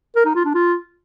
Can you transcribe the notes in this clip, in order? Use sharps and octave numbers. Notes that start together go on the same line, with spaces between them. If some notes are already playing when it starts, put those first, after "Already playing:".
A#4
D#4
F4
D4
F4